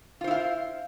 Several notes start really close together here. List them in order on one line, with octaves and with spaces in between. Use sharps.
F4 C5 E4 F5